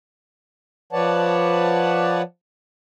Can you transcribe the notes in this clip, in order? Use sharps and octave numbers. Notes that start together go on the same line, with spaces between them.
F3 B4 C#5 D5 F#5 A5